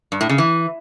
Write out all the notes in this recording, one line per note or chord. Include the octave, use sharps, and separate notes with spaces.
G2
A2
C#3
E3